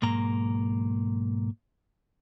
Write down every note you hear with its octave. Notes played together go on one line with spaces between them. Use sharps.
B1 G#2 A#3 A#5